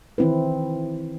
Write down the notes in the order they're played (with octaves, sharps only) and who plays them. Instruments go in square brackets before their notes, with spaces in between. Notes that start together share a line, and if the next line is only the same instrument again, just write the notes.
[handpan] D#3 E3 C4 E4 B4